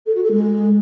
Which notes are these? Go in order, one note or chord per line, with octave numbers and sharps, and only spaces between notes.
A4
F#4
A4
G#3